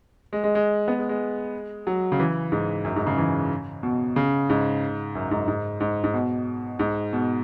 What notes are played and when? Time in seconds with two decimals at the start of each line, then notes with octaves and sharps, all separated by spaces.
0.33 G#3
0.44 G#3
0.55 G#3
0.88 B3
0.98 G#3
1.09 G#3
1.87 F#3
2.12 C#3
2.20 E3
2.52 G#2
2.85 F#2
2.96 G#2
3.07 C#3
3.18 E3
3.83 B2
4.16 C#3
4.49 G#2
5.15 F#2
5.31 G#2
5.48 G#2
5.80 G#2
6.04 G#2
6.14 B2
6.79 G#2
7.13 B2